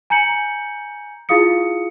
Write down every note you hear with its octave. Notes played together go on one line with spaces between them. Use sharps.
G#5 A#5 G6 C#7 F#7
E4 F4 G#4 F5 D#6 C#7